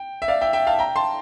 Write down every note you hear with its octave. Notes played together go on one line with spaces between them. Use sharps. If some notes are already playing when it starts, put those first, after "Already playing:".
Already playing: G5
E5
D5 F5
E5 G5
E5 G5
F5 A5
G5 A#5
A5 C6